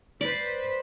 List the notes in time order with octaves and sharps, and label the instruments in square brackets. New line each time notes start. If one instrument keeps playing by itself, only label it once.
[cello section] B4 C5 [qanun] D5